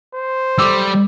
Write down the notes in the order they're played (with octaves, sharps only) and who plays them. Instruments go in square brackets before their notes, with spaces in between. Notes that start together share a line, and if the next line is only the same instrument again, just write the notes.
[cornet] C5
[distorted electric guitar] G3 [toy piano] A4 D6 E6